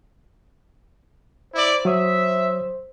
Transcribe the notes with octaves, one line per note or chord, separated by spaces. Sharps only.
E4 C5 D5
F#3 C#5 E5 D#6